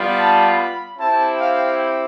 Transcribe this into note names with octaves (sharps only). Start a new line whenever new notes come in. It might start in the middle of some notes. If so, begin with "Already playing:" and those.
Already playing: G3 B3 F4
A5
B5
C4 E4 G4 A5
F5